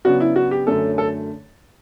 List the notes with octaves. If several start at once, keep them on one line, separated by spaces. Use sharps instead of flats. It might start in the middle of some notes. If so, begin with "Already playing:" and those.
C#3 F#3 B3 D4 F#4
E4
F#4
G4
F#2 D3 A3 C#4 A4
A4